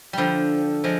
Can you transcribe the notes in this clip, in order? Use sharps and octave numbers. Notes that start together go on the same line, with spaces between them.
D3 F3 G3
F3 G#3